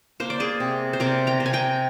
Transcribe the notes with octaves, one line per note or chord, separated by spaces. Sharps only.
A#3 C5
D5
G#4 C5
C3
C5
C3 A#4 D5
G5 A#5
C3
G#5
G5 A#5